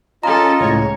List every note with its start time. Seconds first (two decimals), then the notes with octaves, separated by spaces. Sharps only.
0.23 C#4 F4 A4 D#5 A#5
0.61 C#2 A2 G#3 C#5